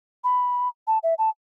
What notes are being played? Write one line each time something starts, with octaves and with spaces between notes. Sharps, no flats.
B5
A5
E5
A5